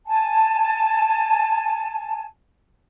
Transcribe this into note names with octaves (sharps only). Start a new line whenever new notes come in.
G#5 A5